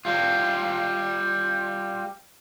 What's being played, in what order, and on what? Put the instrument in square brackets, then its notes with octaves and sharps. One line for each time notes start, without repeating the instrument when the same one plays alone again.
[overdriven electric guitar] G3 F4